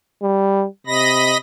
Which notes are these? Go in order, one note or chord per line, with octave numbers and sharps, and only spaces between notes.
G3
C3 D#5 B5 A#6